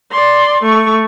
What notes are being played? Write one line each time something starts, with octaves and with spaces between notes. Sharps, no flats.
D5 C6
A3 C#6